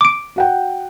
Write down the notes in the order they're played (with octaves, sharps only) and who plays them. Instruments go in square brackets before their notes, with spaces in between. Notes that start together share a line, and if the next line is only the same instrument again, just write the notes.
[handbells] D6 D7
[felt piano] F#4 F#5 G5